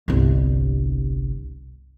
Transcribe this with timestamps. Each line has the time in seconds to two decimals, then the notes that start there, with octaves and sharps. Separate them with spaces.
0.08 G1 C2